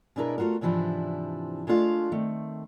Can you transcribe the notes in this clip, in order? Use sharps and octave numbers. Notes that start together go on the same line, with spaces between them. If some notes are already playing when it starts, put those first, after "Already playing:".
B2 G#3 D4 E4 A#4 B4
A3 C4 F4 F#4 A#4
G#2 C3 E3 F3 D4 E4
G#3 A3 D4 F4 F5
D#3 A3 C4